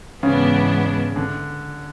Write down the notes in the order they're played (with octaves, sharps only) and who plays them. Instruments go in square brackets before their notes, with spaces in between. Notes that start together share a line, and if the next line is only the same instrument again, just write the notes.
[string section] G#2 E3 B3 D4 [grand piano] C#3
[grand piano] D3